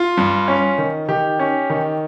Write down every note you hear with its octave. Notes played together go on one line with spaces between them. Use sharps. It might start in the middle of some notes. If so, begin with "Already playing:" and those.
Already playing: F4
G2
C#4
D#3
D#3 G4
C#4
D#3